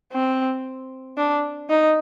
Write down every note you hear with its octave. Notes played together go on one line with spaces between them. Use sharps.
C4
D4
D#4